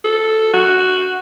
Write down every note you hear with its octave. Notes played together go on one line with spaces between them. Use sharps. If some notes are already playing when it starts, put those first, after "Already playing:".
A4
F#4